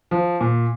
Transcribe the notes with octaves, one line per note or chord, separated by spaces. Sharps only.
F3
A#2